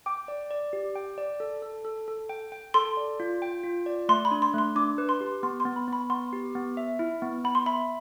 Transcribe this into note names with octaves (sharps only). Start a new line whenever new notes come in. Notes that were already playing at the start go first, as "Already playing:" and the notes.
G5 D6
D5
D5
G4
G5
D5
A4
A4
A4
A4
G5
G5
A4 C6
D5
F4
G5
F4
D5
A3 C6
B5
D4
C6
A3 C6
D4 D6
B4
C6
G4
B3 C6
C6
B3
B5
B3 B5
B3 C6
G4
B3
E5
E4
B3
B3 B5
C6
E5 B5